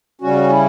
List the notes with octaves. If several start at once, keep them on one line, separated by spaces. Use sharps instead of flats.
C#3 G3 C#4 F#4
E4